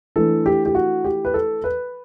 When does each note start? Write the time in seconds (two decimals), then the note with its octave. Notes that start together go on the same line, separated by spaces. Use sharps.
0.16 E3 A3 D4 A4
0.46 G4
0.66 G4
0.75 F#4
1.04 G4
1.25 B4
1.34 A4
1.64 B4